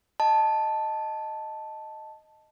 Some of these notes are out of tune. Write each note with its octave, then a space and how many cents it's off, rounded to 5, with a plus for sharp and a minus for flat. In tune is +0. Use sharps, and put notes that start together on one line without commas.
D#5 +0 A5 +0